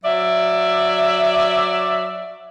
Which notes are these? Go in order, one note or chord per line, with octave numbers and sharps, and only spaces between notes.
F#3 D5 E5